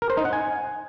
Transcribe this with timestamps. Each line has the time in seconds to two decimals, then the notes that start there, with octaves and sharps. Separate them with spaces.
0.02 A#4
0.10 C5
0.17 D#4
0.25 F#5
0.33 G#5